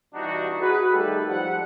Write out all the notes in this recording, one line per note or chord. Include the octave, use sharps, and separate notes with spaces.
G2 B2 E3 D4 D#4 F#4
F#4 G#4 B4
D#3 G3 A3 G4 A4 B4
G#2 F3 G3 F#5